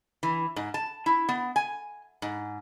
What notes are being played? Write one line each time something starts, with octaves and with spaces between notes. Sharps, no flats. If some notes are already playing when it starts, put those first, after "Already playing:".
E3
G#2
A5
E4
B3
G#5
G#2